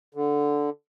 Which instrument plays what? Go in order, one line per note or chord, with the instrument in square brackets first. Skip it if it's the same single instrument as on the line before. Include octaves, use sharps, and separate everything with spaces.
[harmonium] D3